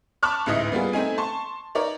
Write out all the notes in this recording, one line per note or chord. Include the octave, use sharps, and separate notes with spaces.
A5 B5 C#6 D6 F6 F#6
A1 D2 G#2 E4 D#5 D#6
G3 A#3 B3 F4 G#4
A3 C4 D#4 G#5
A5 C6 C#6
D#4 A#4 C#5 D5